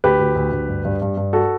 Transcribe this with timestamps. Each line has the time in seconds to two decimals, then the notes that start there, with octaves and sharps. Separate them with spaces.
0.04 D2 G4 B4
0.19 D2
0.36 D2
0.52 D2
0.68 G2
0.85 G2
1.02 G2
1.17 G2
1.33 F#4 A4